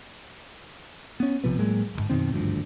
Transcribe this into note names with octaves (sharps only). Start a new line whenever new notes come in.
B3 C#4
B1 C3 F3 B3
A2 F#3 G#3 A#3
D1 G1 G#2
F#2 B2 D#3 C4
G#1 D2 G2 F3